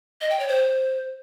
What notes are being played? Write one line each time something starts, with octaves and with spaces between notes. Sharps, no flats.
D#5
G5
C#5
C5